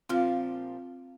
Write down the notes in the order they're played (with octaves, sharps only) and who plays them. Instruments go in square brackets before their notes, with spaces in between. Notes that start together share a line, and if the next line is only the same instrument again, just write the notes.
[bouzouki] A#2 F3 G4 [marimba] C4 F4